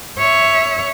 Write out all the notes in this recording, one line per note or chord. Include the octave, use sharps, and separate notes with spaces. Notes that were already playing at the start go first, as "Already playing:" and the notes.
C#5 E5